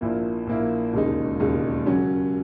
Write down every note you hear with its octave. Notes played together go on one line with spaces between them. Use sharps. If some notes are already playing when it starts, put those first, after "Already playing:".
A#1 A#2 A#3 E4
A#1 A#2 A#3 E4
E1 D#2 C#3 G#3 D#4
E1 D#2 C#3 G#3 D#4
C#3 F#3 C#4